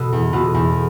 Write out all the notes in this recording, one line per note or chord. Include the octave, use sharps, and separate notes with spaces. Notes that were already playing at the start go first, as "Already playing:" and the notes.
Already playing: B2 B3 A4
E2
B2 B3 F4 A4
E2